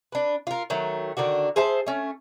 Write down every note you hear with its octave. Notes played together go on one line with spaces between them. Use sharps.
D4 B4
F4 A#4
D#3 F#3 A3
D3 D#3 D4 F#4
G#4 C5 E5 A5
A3 C#4